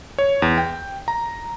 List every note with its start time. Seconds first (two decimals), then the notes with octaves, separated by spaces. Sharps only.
0.18 C#5
0.42 E2
0.58 G5
1.08 A#5